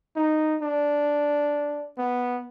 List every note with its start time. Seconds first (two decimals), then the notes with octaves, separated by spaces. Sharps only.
0.16 D#4
0.62 D4
1.98 B3